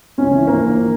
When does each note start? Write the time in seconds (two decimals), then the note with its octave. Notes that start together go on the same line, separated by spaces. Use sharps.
0.18 C#2 C#4
0.32 E3
0.47 A#1 A#3
0.61 E3